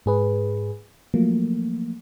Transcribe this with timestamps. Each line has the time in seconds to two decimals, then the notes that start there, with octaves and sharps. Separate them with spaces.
0.06 G#2 G#4 B4
1.14 F3 F#3 A3 A#3